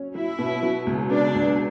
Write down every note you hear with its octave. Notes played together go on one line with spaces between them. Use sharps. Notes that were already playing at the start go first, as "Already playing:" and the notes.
Already playing: F#3 C#4
F#3 E4
B2
F#3
C#2
B3 D4
C#2